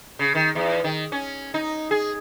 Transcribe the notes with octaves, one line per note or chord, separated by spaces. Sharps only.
C#3
D#3
E2
D#3
C#4
D#4
G#4